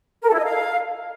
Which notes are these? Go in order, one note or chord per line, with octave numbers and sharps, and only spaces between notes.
A#4
A4
E4
D#5
F5